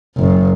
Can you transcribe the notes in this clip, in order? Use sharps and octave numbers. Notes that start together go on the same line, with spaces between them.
F#1